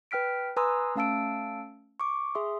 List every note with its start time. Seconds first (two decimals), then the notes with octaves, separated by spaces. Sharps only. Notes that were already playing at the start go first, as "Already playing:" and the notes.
0.11 B4 G5 F6 B6 D7
0.57 B4 G#5 A#5 C6 D#6 E6
0.95 A3 C#4 F5 A5 E6 D7
2.00 C#6 D6
2.35 G#4 E5 C6 D#6